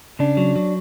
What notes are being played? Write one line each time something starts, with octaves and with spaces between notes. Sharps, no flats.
C#3 D4
F#3
F#3